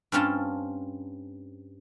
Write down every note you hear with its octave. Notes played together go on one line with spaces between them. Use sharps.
G2 C4 C#4 F4 A5